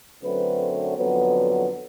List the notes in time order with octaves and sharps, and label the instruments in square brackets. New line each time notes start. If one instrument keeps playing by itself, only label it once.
[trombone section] F#2 D3 F#3 A3 C4 B4
F2 D3 F#3 B3